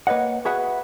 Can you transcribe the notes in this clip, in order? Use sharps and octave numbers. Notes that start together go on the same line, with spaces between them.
A#3 B4 C#5 D#5 F#5
F#4 G#4 B4 E5 F#5